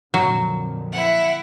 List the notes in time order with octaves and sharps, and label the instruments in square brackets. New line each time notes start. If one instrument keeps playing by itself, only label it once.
[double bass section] F2 A#2 D3 [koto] F#3
[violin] E4 F#5